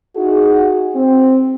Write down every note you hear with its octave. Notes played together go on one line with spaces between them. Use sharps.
D#4 E4 F#4 G#4
C4